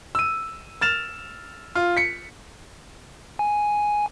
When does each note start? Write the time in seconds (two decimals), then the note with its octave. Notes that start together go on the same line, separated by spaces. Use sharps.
0.15 E6 D#7
0.81 F6 A6 E7 F7
1.75 F4
1.97 B6 C#7
3.39 G#5